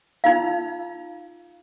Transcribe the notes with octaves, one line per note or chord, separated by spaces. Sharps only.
D#4 F4 F5